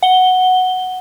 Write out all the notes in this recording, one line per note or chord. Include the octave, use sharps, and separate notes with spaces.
F#5 G7